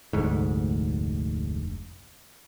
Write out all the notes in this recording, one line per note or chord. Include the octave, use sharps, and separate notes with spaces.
F1 D2 G#2